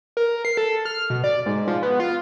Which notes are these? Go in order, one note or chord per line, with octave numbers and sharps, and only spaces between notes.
A#4
C7
A4
F6
B2
D5
G#2
F3
B3
F4